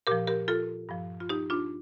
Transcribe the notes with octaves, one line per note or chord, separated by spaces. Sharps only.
A#2 F3 G4 A#4
G4 A#4
F4 A4
G2 F3
F4
D#4 G4
D4 F4